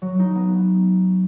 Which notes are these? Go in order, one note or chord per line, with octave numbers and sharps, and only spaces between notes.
F#3
D#4
B3